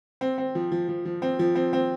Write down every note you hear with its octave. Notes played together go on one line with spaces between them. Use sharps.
C4
C4
F3
F3
F3
F3
C4
F3
C4
C4